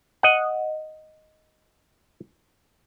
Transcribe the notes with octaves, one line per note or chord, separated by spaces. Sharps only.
D#5 F#5